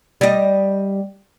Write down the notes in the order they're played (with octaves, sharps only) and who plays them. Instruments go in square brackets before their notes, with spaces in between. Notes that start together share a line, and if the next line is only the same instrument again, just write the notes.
[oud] G3 D#5